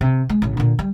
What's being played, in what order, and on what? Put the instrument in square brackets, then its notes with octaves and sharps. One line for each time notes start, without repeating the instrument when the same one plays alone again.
[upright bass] C3
G#3
A1 C#3
A#2 D3
G3